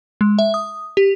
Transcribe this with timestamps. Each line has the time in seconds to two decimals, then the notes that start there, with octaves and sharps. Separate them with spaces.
0.21 G#3
0.39 E5
0.54 D#6
0.97 G4